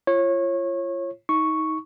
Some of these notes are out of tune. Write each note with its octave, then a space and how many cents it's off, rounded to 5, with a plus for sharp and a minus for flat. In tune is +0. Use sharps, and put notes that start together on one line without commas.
F4 -30 C#5 -25
D#4 +25 C#6 +0